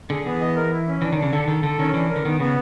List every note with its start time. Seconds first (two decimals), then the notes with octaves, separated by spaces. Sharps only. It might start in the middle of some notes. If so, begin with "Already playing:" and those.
0.10 D3 G#4
0.26 E3 B3
0.41 D#5
0.56 A#4
0.72 E4
0.87 C#4
1.02 E3 D4
1.12 D#3
1.17 D4
1.22 C#3
1.33 D3 A4
1.48 D#3 A4
1.63 D3 A4
1.79 D#3 C#4
1.94 E3 D4
2.09 A#4
2.16 D3
2.25 D#3 B3
2.40 C#3 B3